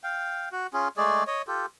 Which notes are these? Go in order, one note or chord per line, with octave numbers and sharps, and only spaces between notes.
F5 G5
F#4
C#4 F4 G#4
G#3 A3 G#4 D5
C#5 D#5
F4 G4 A4